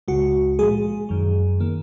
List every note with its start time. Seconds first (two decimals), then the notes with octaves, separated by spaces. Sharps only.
0.08 C#2 C#3 G#3 F#4
0.59 A#2 F3 G#3 G#4
1.09 F#2 D#3 F#3
1.60 D#3 A#3